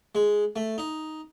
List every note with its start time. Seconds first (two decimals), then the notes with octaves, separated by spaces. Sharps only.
0.15 G#3
0.56 A3
0.78 D#4